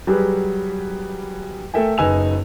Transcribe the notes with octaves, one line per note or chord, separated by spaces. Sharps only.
F#3 G3 G4 G#4 B4
A3 A4 A#4 E5 G5 G#5
F#1 D#4 B4 G#5 E6 F7